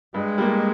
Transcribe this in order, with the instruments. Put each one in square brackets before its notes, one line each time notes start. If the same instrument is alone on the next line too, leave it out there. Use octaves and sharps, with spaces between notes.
[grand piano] G2 [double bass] G#3
[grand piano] G3 A#3